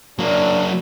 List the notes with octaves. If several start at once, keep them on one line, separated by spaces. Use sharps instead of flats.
F#3 A#3 D4